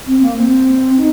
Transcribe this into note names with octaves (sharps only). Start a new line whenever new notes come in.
C4
A#3
C4
D#4